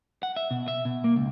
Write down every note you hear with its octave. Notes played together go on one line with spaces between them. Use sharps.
F#5
E5
B2
E5
B2
A#3
C#2